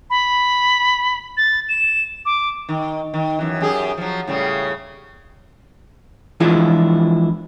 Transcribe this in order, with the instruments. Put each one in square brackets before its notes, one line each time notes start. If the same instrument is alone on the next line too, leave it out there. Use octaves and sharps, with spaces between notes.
[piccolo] B5
A6
E7
D6
[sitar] D#3
D#3
F#2 E3
F#2 G4 G#4
F3 F#3
A2 C#3 G3
[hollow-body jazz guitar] E3 F3 G#3 D4 E4 F4